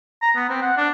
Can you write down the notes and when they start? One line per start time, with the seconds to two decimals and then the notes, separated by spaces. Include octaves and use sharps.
0.22 A#5
0.35 B3
0.49 C4
0.61 F#5
0.77 D4